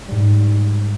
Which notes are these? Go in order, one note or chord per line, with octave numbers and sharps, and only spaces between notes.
G#2 G3